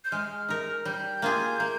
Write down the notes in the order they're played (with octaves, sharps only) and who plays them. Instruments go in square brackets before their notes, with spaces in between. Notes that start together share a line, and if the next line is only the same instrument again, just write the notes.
[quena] G6
[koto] G#3 [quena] F6
[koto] D#4 A#4
[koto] G3 [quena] G6
[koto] A#3 F4 G#4
A#3